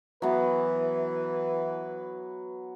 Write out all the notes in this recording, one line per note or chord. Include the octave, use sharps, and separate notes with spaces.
E3 F#3 B3 B4